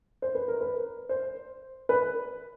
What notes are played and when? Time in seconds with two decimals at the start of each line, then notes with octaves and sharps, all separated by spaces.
0.22 C5
0.35 B4
0.48 A#4
0.61 B4
1.09 C5
1.89 B4